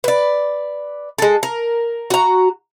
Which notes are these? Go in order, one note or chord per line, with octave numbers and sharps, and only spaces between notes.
B4 D5
G#3 A4
A#4
F#4 A#5